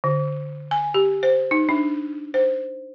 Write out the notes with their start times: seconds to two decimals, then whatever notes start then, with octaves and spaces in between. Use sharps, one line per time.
0.04 D3
0.71 G#5
0.94 G4
1.23 C5
1.51 D#4
1.69 D4
2.34 C5